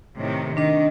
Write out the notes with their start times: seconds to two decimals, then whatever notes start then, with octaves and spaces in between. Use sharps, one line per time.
0.18 A2 C3 D#3
0.57 D#3 D4 D#5